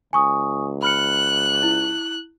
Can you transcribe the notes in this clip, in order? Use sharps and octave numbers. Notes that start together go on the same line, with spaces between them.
C#2 G#5 C#6 D#6
B5 F6 F#6 C#7
E4